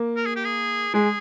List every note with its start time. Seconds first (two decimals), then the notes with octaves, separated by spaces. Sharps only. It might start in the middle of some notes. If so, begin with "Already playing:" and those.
Already playing: A#3
0.17 A#4
0.26 G#4
0.36 G4
0.45 G#4
0.94 G#3 G#4